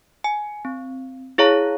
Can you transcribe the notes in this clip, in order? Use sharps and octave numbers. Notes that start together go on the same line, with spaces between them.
G#5
C4
E4 G#4 C#5 F5 A#5